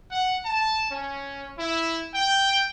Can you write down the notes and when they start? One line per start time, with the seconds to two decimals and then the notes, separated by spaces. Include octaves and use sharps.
0.11 F#5
0.44 A5
0.90 C#4
1.59 E4
2.14 G5